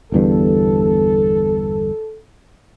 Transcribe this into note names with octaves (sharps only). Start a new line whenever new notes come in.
G1 E2 G2 A4